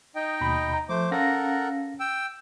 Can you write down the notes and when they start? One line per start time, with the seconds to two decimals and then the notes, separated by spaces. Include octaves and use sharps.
0.15 D#4 D#5 G5
0.41 D#2 B2 B5
0.74 A#5
0.89 F3 A3 C5 D6
1.11 C#4 A4 A#4 F5 F#5 A#6
2.00 G5 E6